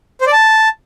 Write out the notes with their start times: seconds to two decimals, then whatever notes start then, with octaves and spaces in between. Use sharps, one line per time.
0.21 C5
0.27 D5
0.32 A5